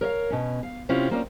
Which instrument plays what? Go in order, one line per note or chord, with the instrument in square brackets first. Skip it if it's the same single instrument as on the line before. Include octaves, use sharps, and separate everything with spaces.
[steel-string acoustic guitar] A#4 C#5 D#5 F5
B2 C#4
F5
C3 C4 C#4 E4 F4
A#3 C4 C#4 F4 A#4 D5